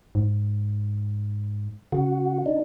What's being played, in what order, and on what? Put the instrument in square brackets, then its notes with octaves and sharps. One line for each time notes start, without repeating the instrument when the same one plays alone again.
[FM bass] G#2
[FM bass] C#3 [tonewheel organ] F#4
[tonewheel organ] D4 D#4